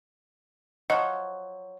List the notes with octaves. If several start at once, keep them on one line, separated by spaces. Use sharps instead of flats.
F3 F#3 D#5